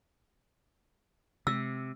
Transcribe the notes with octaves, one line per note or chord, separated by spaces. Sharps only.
C3 E6